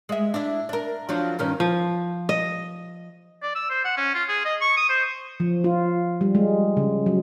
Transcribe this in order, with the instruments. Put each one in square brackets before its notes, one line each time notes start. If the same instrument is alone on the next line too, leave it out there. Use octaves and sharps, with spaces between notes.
[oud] G#3 E5
D4 E4
D4 A#4
F3 F#3 D4
G2 D#3 C#4
[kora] F3
D#5
[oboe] D5
E6
C5
F#5
C#4
F4
G#4
D#5
C#6
D#6
C5
[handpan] F3
F4
G3
G#3
C#3
F#3